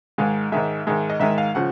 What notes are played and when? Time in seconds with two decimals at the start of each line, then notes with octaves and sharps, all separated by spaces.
0.18 G#2 D#3 G#3 F5
0.52 G#2 D#3 G#3 E5
0.87 G#2 D#3 G#3
1.10 D#5
1.20 G#2 D#3 G#3 E5
1.38 F5
1.55 C#3 F3 F#5